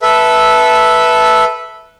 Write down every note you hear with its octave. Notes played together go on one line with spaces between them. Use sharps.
A4 B4 E5